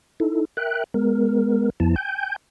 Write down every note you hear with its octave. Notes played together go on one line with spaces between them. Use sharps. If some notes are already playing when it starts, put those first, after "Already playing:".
D#4 E4 A4
A#4 E5 G5 F#6
G#3 B3 A#4
F2 F3 B3 E4 A5
G5 G#5 G6